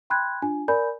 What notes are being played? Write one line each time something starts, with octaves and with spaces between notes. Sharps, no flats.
G5 B5 C6 F#6 G#6
D4 F4 G#5
A#4 D5 G#5 B5 G6